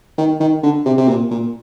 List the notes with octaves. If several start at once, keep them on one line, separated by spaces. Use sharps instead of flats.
D#3
D#3
D3
C3
C3
A#2
A#2